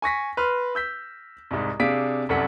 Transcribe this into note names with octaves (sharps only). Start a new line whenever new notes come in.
G#5 C#6 A#6 B6
B4 C6 F6
E6 G6 B6
C2 G#2
C3 D4 G#4 F5 B6 D7
C2 F#2 A4 F#5 B6